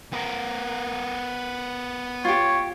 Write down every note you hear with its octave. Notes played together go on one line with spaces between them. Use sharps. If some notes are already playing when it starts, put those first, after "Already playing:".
B3 A#4
F4 G4 C#5